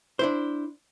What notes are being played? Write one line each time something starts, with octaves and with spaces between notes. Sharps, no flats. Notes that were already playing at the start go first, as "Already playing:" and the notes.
D4 E4 C5